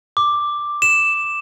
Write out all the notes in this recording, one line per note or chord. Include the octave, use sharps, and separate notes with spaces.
D6
E7